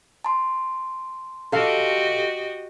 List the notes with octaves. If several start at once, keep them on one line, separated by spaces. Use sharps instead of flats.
A5 C6
F#4 G4 A4 D#5 F5